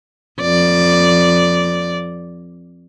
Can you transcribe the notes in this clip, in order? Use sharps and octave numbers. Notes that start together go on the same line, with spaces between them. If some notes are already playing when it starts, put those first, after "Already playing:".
F2 D5